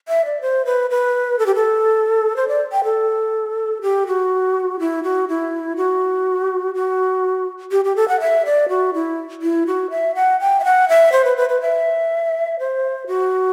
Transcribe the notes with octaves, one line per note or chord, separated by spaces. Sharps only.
E5
D5
C5
B4
B4
A4
G4
A4
C5
D5
G5
A4
G4
F#4
E4
F#4
E4
F#4
F#4
G4
G4
A4
F#5
E5
D5
F#4
E4
E4
F#4
E5
F#5
G5
E5
F#5
E5
C5
B4
B4
B4
E5
C5
F#4